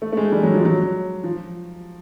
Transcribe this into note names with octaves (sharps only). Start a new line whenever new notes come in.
A3
A3
G#3
G3
F#3
F3
F#3
F3